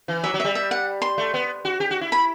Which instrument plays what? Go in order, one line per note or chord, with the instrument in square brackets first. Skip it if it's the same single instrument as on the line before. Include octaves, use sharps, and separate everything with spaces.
[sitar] E3
[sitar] F#3 [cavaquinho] E5
[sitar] F#3
[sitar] G3 [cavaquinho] E5
[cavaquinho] E5
F#5
C6
[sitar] A3
B3
F#4
G4
F#4
E4
[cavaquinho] B5